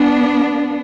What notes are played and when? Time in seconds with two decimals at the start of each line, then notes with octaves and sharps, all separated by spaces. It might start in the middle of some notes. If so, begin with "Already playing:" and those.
Already playing: B3 D4